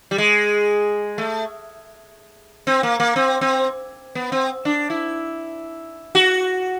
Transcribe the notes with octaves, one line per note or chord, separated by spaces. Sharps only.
G3
G#3
A3
C4
A#3
A#3
C4
C4
B3
C4
D4
E4
F#4